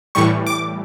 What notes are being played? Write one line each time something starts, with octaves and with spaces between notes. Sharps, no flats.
A2 E3 G3 C#6
D6